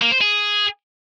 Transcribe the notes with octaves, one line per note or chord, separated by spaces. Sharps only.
A#3
C5
G#4